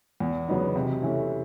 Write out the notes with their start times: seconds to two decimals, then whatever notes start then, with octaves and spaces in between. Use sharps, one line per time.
0.20 E2
0.48 C#3 F#3 B3 D#4
0.76 C3
1.02 E3 A3 C#4 E4